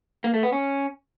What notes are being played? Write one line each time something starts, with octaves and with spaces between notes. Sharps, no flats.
A#3
A3
B3
C#4